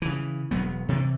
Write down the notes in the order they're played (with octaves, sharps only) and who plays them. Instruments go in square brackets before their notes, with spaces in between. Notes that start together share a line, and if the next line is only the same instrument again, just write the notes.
[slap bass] C#3 E3
E1 F#3 B3
C3 E3